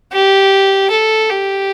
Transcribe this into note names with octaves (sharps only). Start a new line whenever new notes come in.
G4
A4
G4